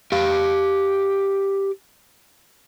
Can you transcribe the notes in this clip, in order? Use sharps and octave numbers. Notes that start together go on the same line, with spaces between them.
G4 F5